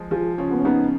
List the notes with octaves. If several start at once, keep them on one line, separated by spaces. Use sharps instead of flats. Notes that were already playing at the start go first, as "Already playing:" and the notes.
Already playing: F3 G#3
F3 F4 G#4
C#3 C#4 F4
B3
C#4
C#3 B3 D#4